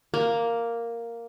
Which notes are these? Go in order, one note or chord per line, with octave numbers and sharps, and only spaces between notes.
A#3